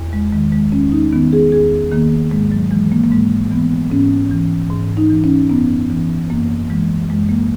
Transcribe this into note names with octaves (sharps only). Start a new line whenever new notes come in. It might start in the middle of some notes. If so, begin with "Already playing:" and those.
Already playing: E2
G#3
D#3 G#3
G#3
E2 C#4
D#4
D#3 B3
G#4
E2 G#4
D#3 A#3
G#2 G#3
F#3
E3 G#3
A#3
A#3
G#2 G#3
E3 B3
G#2 C#4
E3
G#2
D#4
E3
C#4
F#2 B3
E3
F#2 A#3
E3 G#3
F#2 G#3
A#3